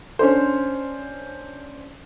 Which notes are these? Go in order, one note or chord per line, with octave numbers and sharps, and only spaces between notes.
C#4 D4 C5